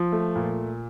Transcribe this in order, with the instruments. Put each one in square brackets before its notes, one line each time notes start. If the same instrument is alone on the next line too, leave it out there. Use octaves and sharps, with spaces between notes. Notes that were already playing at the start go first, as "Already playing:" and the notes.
Already playing: [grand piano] F3
A3
A#2